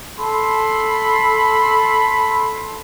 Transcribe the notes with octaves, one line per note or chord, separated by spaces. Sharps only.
A4 B5 C6